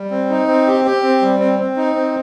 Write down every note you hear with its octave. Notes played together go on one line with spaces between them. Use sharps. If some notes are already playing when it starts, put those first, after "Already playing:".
Already playing: G3
C4
D#4
C4
G4
G4
C4
G3
C4
C4
D#4
C4